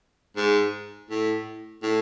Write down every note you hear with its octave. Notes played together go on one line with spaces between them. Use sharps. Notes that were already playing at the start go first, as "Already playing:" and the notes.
G#2
A2
A2